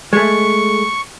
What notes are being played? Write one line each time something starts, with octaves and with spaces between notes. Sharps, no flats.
G#3 A3 C#6